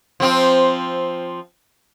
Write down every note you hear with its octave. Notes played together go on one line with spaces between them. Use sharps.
F3 C4 F4